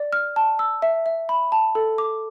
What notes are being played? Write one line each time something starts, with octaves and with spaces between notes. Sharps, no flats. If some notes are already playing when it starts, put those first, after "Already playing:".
Already playing: D5
F6
A5
E6
E5
E5
B5
A5
A4
D6